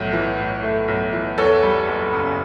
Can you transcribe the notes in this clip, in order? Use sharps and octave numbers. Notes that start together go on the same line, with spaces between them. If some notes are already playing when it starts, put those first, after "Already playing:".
Already playing: B1 A2 A3
E3
A2
A3
B1
E3
E2 A4 C#5
G3
F#1
C#3